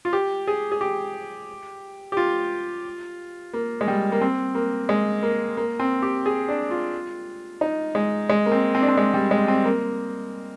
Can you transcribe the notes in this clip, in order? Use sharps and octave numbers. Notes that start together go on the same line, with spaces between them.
F4
G4
G#4
G#4
G4
G4
F4
A#3
G#3
G3
A#3
C4
A#3
G#3
A#3
A#3
C4
G4
G#4
D4
F4
D#4
G#3
G#3
A#3
C4
C4
D4
C4
G#3
G3
G#3
C4
A#3